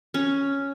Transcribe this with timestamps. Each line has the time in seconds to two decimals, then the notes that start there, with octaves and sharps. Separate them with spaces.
0.14 C#4